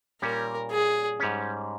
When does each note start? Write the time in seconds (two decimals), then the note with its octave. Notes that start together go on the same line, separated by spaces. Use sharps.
0.22 A#2 G3 C#4 A#4
0.71 G#4
1.20 G#2 G3 C#4